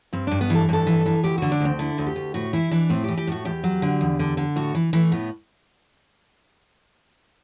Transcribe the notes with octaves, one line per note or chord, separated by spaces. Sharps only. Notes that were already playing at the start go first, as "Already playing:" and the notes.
G2 C4
G2 D4
B3
E3 A4
G2 A4
E3
E3
D2 G4
D3 F#4
D4
D2 C4
D3 E4
D2
G4
D2
A2 F#4
E3 E4
E3 D4
A2 C4
E3 G4
G4
A2 F#4
E2 G4
F#3
D3
E2
D3
D3
A2 F#4
E3
E3 A3
A2 B3